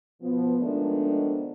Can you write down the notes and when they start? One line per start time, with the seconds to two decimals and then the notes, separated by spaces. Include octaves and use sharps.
0.21 B2 F3 B3
0.59 D#3 F3 G#3 A3 B3 D4